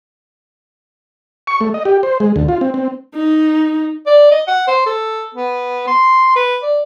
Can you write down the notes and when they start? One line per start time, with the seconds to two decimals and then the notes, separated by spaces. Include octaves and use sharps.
1.47 C#6
1.61 A3
1.74 D#5
1.85 G4
2.03 C5
2.20 G#3
2.36 D2
2.48 F4
2.61 C4
2.74 C4
3.15 D#4
4.07 D5
4.31 D#5
4.48 F#5
4.68 C5
4.86 A4
5.35 B3
5.87 C6
6.35 B4
6.63 D5